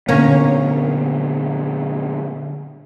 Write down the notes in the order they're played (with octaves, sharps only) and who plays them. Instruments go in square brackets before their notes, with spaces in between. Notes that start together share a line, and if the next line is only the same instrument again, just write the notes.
[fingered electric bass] A#2 D3 B3 [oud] A#3 C#4